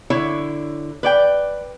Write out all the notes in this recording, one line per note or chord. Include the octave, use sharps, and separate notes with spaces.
D3 E4 C#5
B4 D5 G5